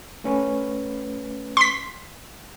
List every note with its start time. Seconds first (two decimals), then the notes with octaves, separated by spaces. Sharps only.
0.24 A3 C#4 B4
1.57 C6 B6